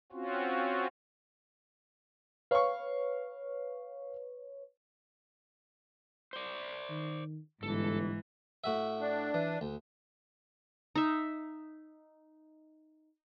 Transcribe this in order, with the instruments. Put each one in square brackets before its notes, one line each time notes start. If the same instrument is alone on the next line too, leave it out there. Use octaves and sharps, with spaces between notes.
[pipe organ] C4 C#4 F4 F#4
[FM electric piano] B4 C#5 [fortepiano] F5 C#6
[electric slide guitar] C5 D5
[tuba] D#3
[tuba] G1 [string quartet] G#2 E3 [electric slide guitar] A4
[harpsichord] A2 F#4 E5
[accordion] D4
[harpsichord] E3
D2
[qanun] D#4 E5